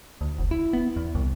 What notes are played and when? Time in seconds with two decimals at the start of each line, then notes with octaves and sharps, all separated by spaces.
0.21 D2
0.39 F1
0.51 E4
0.73 B3
0.96 E2
1.15 C2